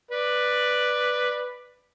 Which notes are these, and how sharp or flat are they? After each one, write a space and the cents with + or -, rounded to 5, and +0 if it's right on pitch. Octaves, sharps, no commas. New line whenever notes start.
B4 +0 D5 +10